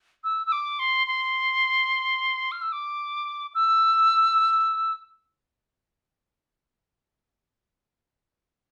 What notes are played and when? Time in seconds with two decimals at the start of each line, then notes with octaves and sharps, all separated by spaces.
0.24 E6
0.46 E6
0.52 D6
0.79 C6
1.07 C6
2.52 F6
2.61 E6
2.72 D6
3.55 E6